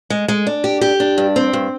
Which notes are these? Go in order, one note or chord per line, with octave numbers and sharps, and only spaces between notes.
G#3
G#3
D4
G4
G4
D4
G2
C4
G2